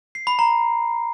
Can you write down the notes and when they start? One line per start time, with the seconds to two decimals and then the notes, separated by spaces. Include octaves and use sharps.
0.15 C7
0.27 B5
0.39 A#5